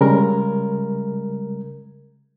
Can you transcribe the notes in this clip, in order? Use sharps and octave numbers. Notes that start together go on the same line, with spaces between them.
C#3 G3 G#3 A#4